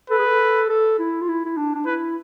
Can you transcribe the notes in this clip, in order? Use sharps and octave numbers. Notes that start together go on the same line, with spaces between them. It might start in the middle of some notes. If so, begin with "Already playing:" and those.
A4 B4
G#4
A4
A4
E4
F4
E4
E4
D4
D4
E4 B4